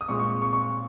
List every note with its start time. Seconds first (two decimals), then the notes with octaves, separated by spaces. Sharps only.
0.01 D#6
0.08 A#2 G#3 C4 C#6
0.19 C#6
0.42 C#6
0.53 C#6